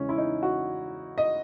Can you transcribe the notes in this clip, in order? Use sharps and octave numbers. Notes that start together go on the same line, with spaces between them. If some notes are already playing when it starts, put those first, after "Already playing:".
Already playing: E2 C#3 E3 G#3 C#4
E4
D#4
F#4
D#5